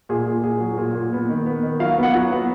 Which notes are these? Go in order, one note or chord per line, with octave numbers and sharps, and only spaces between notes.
A#2 G#4
A#2 G#4
A#2 G#4
F#3
A#2
A#2
B3
D#3
B3
D#3
F#3 F5
B3
F#5
F#3
B3